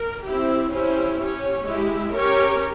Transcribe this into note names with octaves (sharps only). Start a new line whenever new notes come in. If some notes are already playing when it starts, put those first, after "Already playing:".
Already playing: A#4
C4 E4 G4
C#4 E4 G4 C5
C#4 G4 C#5
G#3 E4 G4
C#4 G4 A#4 C#5